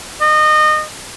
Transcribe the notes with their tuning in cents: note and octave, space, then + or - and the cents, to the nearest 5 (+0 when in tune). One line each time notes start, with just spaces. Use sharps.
D#5 -25